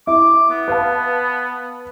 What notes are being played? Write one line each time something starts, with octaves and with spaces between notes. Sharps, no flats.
E4 D6
B3
B4 F5 A5